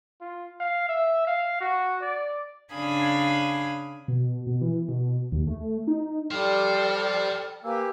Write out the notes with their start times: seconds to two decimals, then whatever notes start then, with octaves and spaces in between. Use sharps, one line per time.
0.21 F4
0.60 F5
0.89 E5
1.27 F5
1.61 F#4
2.02 D5
2.73 C#3 D4 F5 G#5 B5 D#6
4.08 B2
4.47 B2
4.61 E3
4.89 B2
5.32 D#2
5.47 A3
5.88 D#4
6.31 G3 A4 C5 D5 F5 G5 F6
7.64 A#3 G4 B4 G#5 E6